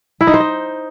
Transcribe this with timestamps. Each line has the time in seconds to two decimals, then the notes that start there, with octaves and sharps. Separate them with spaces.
0.21 E4
0.27 D#4
0.34 C5
0.40 D#5